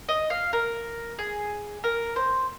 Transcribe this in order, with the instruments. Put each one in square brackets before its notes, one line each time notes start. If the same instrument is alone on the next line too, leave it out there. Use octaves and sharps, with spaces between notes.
[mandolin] D#5
F5
A#4
G#4
A#4
C5